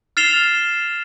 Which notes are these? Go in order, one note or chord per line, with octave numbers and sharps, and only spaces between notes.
F6 A6 C7 E7 F7 G7